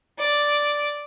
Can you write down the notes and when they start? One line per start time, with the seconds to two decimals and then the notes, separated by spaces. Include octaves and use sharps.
0.19 D5